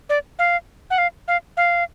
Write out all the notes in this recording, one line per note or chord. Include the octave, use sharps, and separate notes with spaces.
D5
F5
F#5
F5
F5
F5